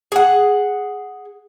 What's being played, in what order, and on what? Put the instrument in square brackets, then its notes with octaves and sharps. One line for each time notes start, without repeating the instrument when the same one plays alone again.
[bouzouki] G#4 F#5